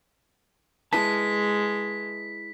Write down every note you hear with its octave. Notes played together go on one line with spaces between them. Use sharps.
G#3 E4 B4 A5 B6